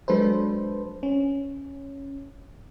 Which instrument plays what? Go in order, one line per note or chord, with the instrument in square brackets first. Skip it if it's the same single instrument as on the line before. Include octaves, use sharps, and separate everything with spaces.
[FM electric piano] F#3 G#3 D4 A4 B4 C5
C#4